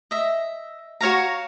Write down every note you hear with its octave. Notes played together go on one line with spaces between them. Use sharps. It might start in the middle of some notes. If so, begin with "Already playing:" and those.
D#5 E5
F#4 C#5 F5 A#5